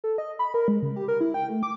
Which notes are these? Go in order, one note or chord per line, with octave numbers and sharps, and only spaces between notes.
A4
D#5
B5
A#4
G#3
C#3
G4
A#4
E4
G5
A3
D6